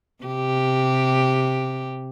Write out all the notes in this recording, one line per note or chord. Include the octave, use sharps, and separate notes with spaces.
C3 G4